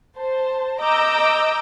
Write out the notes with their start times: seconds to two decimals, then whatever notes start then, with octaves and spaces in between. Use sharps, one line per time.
0.17 C5 A5
0.81 D#5 A#5 D6 E6 G6 D7